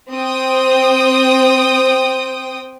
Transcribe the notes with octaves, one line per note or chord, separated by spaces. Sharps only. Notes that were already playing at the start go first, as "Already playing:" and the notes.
C4 G5 D#6